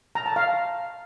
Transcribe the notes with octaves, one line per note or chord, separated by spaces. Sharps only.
A#5
A5
F5